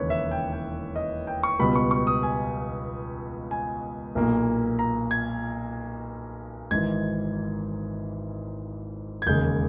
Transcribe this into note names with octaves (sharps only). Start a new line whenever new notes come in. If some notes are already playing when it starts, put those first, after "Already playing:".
Already playing: E1 D#2 C#3 E3 B4 C#5
E5
G5
G5
D#5
G5
C#6
C#2 B2 G3 B3 B5
C#6
C#6
D#6
G#5
G#5
B1 A#2 A#3
A#5
G#6
G#1 G#2 E3 G#6
G#6
E1 D#2 C#3 G#3 G6